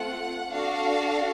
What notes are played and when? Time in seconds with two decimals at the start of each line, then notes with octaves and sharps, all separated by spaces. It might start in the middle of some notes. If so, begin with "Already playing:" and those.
Already playing: A3 C4 F4 F#5
0.52 D4 F#4 A4 F5